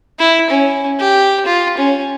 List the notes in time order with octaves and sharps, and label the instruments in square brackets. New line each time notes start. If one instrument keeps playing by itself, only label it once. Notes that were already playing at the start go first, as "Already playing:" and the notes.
[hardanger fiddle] E4
C#4
G4
F4
C#4